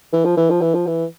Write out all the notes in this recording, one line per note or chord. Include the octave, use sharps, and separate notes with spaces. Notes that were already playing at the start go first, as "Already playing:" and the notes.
E3
F3
E3
F3
E3
F3
E3